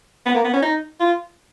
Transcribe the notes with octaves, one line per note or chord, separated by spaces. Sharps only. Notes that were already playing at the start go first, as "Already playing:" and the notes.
B3
A#3
B3
C#4
D#4
F4